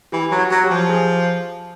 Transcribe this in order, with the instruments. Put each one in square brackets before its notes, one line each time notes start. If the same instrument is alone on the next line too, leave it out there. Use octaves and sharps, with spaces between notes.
[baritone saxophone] E3 [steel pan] G4
[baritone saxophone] F#3
[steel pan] F#4
[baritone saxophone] F#3
[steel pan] G4
[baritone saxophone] F3
[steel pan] G#4